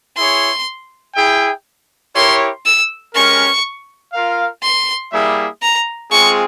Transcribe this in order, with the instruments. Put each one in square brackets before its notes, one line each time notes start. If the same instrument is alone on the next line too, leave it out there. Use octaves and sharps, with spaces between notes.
[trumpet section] E4 G#4 C#5 [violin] C6
[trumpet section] E4 G#4 E5 G5
[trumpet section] E4 G4 A#4 C#5 [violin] C6
[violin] E6
[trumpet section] G#3 C#4 G4 A#4 [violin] C#6
[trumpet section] F4 A#4 F5
[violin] C6
[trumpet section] G3 A#3 E4 G#4 E5
[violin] A#5
[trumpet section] G#3 C4 F4 G#4 [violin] C#6